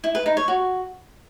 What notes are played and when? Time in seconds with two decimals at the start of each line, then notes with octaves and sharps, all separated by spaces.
0.04 E4
0.15 B4
0.26 D#4
0.37 C#5
0.48 F#4